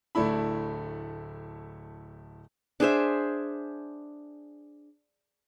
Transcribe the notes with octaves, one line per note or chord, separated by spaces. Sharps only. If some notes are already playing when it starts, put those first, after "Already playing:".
D1 A3 D4 E4 B5
D4 G#4 C5 E5